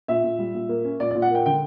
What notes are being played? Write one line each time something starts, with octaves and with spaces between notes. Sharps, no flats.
A#2 E5
A#2
G3
A#2
A#3
C#4
A#2 D5
A#2 D5
F#5
A#3 G5
D3 G5